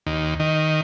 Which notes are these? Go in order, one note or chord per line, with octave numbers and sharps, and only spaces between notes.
D#2
D#3